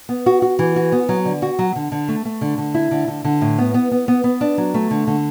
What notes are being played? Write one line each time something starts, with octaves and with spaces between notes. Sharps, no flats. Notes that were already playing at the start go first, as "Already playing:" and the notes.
B3
F#4
F#4
E3
F#4
B3
F#3
D3
F#4
F#3
D3
D3
A3
A3
D3
D3
E4
D3
D3
D3
A2
B3
B3
B3
B3
B3
D4
F#3
A3
D3
D3